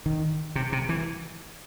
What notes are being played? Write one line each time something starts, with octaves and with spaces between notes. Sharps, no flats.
D#3
C3
C3
E3